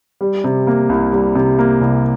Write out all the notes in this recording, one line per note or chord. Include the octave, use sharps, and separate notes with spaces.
G3
C3
A#3
C2
G3
C3
A#3
C2